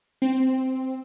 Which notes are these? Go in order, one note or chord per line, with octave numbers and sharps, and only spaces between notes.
C4